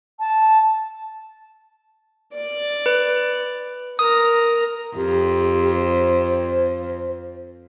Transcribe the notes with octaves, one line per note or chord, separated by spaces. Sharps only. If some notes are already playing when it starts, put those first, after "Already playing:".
A5
D5
B4
A#4 A#5 D#6
F2 G4
C5